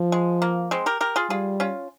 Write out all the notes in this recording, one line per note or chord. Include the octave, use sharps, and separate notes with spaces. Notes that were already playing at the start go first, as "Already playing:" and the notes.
Already playing: F3
G#3
A#3
G#3 C4
G4 A#4
G4 A#4
F4 G#4
G3 F4 G#4
C#4 F4